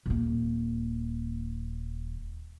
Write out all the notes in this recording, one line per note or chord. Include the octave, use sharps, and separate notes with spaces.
D#1 A#3